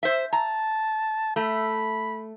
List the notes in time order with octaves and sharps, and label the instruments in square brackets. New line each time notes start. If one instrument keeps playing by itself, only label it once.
[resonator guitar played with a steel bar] C5 E5
[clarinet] A5 [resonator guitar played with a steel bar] A#5
[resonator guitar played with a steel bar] A3 [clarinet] B5